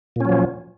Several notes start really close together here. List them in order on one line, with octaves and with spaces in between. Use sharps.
A#2 C#4 F#3 F3